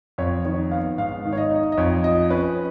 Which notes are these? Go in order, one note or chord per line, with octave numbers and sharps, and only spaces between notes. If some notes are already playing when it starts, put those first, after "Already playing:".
F2 C#5
D#3 C#5
B3 F5
G#2 F5
D#3
C#5
D#5
D#4
D#5
F2 C#5
F3 D#5
C#4 B4